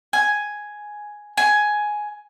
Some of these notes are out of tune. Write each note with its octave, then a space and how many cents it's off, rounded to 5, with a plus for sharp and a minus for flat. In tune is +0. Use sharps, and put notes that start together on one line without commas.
G#5 +5
G#5 +10